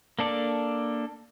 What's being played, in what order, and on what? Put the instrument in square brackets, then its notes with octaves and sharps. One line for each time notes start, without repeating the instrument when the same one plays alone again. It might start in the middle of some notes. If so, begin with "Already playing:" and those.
[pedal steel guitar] A#3 D4 A4 D5